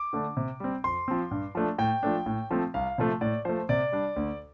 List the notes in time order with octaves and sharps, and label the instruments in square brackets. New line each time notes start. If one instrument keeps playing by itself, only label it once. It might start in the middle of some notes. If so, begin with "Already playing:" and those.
Already playing: [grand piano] D6
D3 A3 D4
C3
G3 C4
F2 C6
F3 C4
G2
F3 A3 D4
A2 G5
F3 A3 D4
A2
F3 A3 C4
C2 F5
C3 F3 A3
A2 D5
F3 A3 C5
C3 D5
G3 D4
D2